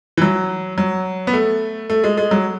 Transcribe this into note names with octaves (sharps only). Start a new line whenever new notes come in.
E3
F#3
F#3
B3
A3
A3
G#3
G#3
F#3